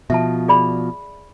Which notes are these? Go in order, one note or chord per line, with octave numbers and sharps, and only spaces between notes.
B2 F3 E5 A5
G#4 D5 B5